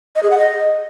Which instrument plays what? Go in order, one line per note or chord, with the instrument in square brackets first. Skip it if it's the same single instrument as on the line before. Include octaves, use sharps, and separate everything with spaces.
[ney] D#5
G#4
F#5
D#5